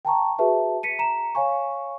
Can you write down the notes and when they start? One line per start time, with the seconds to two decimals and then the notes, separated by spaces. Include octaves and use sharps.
0.05 G5 A5 A#5 C#6
0.39 F#4 G#4 B4 E5 A5
0.83 B6 C#7 D#7
0.99 A#5 E7
1.35 C#5 F5 G#5 C#6